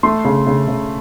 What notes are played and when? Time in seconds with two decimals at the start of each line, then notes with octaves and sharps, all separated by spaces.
0.03 A3 C6
0.25 C#3
0.46 C#3
0.68 C#3